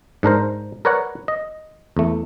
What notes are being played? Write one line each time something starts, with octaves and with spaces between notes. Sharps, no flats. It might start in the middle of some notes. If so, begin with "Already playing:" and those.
G#2 D4 A#4 C5
A#4 B4 C#5 D5 F#5
D#5
E2 A3